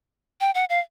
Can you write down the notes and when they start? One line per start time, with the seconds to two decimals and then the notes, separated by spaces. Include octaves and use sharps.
0.41 G5
0.55 F#5
0.70 F5